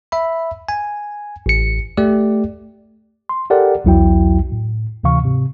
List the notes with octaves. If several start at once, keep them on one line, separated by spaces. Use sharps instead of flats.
E5 B5
G#5
A1 C#7
A3 G4 D5
C6
G4 A4 A#4 D5 F#5 G5
B1 E2 F#3 E4 F#4 G5
A2
D2 C3 E3 F5 C#6
G#2 C3